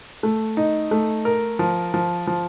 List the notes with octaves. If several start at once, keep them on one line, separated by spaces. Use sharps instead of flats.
A3
D#4
A3
A#4
F3
F3
F3